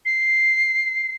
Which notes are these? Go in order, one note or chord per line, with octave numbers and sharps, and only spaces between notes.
C7